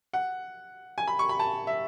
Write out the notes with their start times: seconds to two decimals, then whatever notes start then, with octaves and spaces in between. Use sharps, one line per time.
0.13 F#5
0.98 G#5
1.08 B5
1.19 C#6
1.29 B5
1.40 A5
1.67 E5